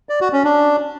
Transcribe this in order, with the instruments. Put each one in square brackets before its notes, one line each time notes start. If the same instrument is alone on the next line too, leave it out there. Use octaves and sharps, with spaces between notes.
[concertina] D5
F#4
C#4
D4